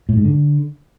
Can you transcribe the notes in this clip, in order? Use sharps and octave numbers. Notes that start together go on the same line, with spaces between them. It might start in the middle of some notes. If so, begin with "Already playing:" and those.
A2
G#2
D3